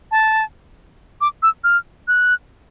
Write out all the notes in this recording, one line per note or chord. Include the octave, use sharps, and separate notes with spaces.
A5
D6
E6
F6
F#6